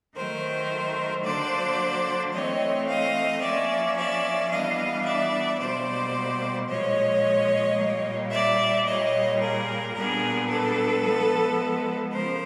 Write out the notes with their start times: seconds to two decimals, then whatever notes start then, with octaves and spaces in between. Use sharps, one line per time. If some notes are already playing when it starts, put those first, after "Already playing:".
0.15 D#3 F#3 A3 A#4 C5
1.24 D3 F#3 A#3 D4 C5 D5
2.33 E3 A3 C4 C#5 D#5
2.87 D#5 F5
3.41 F3 A#3 C#4 D5 E5
3.96 D5 E5
4.50 E3 G3 B3 D4 D#5 F5
5.04 D5 E5
5.59 B2 G3 A#3 C5 D5
6.68 A#2 F3 G#3 C#5 D#5
7.77 A#2 G3 A#3
8.31 D5 E5
8.85 A#2 G3 A#3 C#5 D#5
9.40 G#4 A#4
9.95 A#2 G3 B3 D4 G#4 A#4
10.49 A4 B4
11.03 F3 G#3 B3
12.12 C#3 F3 A#4 C5